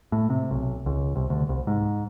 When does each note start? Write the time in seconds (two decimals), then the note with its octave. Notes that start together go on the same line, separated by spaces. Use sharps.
0.12 A2
0.30 C3
0.51 B1
0.86 C#2
1.16 C2
1.30 D2
1.49 C2
1.67 G#2